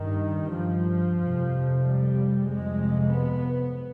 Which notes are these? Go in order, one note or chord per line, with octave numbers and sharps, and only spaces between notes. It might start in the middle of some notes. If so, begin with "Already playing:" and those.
Already playing: G2 D#3
F3
F2 C3
G3
F2 C3 G#3
B3